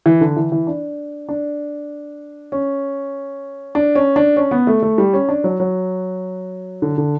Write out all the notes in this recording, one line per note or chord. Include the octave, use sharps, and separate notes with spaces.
E3
D3
E3
E3
D4
D4
C#4
D4
C#4
D4
C#4
B3
A3
A3
G3
C#4
D4
F#3
F#3
D3
D3